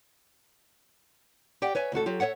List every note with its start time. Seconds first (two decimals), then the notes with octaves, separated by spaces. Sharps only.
1.62 G4 D5 F#5 G5
1.75 B4 C#5 E5 G#5
1.92 D2 D#3 F#4 A4
2.06 F#3 F4 G4
2.20 A4 B4 C#5 E5 F#5